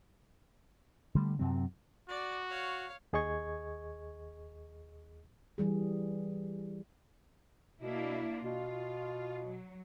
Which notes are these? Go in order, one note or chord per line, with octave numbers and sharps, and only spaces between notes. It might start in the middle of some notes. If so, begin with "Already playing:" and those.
D3 G3 A3
F#2 C3 F#3 C4
F#4 D5
C#5 F5
D#2 G#4 D#5 C#6 G#6
E3 G3 G#4
B2 A#3 D4 E4
B2 F4
F#3